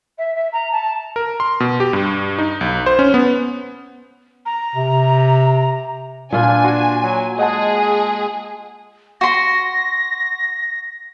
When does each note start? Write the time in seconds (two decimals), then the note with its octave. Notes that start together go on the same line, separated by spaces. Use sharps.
0.18 E5
0.35 E5
0.52 A#5
0.71 A5
1.16 A#4
1.40 C6
1.60 B2
1.80 G4
1.93 G2
2.39 D#4
2.61 B1
2.86 C5
2.99 C#4
3.14 B3
4.46 A#5
4.75 C3
6.32 A#2 D4 F4 B4 G#5
6.64 F#4 C6
7.03 F#3
7.39 G#3 G#4 D#5 F#5 A5
9.21 F#4 C6 A#6